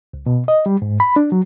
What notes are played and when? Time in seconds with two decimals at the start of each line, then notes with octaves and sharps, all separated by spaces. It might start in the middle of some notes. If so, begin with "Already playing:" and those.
0.14 C#2
0.26 B2
0.48 D#5
0.66 G3
0.82 G#2
1.00 B5
1.16 D4
1.32 F#3